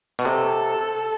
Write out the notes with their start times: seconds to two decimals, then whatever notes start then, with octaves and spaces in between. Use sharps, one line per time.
0.19 B2
0.25 C3 A4